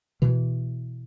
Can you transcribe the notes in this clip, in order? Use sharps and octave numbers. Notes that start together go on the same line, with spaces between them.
B2 E3